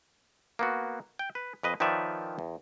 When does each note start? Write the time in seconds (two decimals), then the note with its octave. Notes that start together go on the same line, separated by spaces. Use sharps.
0.59 A#3 B3 F#4
1.19 G5
1.35 B4
1.63 F2 B4 D#5
1.80 D#3 F3 B4 C#5 D5 E5
2.39 E2